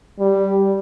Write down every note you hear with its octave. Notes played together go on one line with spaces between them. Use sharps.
G3